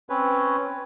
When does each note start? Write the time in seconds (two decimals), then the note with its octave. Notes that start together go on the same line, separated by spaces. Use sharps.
0.10 C4 C#4 B4 C#5